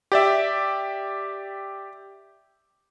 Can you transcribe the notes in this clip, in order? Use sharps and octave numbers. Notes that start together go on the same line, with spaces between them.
G4 D5 E5